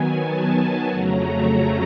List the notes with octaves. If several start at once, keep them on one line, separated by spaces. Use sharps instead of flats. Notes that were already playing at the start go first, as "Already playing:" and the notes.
Already playing: D#3 F#3 B3 G#5
A5
F2 C#3 F#3 A3 C#4 A#5